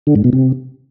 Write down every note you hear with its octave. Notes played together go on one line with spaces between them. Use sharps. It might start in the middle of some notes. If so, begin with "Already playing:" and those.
D3
G#2
B2
C3